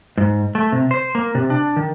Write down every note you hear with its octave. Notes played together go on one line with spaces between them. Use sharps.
G#2
A3
C3
C5
A#3
C3
D4
D#3